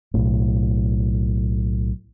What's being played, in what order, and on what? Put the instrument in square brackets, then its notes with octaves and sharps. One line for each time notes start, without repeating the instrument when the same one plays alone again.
[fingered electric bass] B1 A2